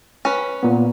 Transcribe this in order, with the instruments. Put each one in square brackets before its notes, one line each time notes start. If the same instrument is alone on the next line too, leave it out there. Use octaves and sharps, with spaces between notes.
[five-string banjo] C#4 B4
[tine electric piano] A#2 B3